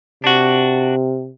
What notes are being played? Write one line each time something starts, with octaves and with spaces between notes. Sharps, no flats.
C3 D4 F#4